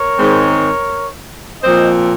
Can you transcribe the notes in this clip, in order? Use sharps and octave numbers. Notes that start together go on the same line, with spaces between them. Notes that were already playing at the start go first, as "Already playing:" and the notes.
Already playing: A#4 C#5
G#2 D#3 G#3 C4
A#2 F3 C4 C5 D#5